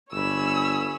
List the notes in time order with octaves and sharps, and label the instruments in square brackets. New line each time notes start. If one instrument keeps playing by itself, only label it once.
[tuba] G1 [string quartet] C#5 G#5 B5 [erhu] E6